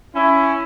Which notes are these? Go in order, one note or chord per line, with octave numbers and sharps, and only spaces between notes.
C#4 E4